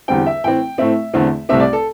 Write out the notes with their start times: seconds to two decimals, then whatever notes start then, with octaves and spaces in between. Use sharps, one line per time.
0.08 E2 D3 G3 C4 G5
0.27 E5
0.44 A2 E3 C4 G5
0.78 A2 A3 C4 E5
1.14 E2 D3 A3 C4
1.49 C2 C3 A3 C4 E5
1.60 D5
1.73 A4